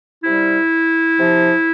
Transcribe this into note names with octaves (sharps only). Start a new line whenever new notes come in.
C3 G3 E4
C3 F3